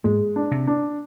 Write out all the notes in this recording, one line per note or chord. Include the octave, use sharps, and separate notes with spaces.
G#2 G#3
D4
C3
D4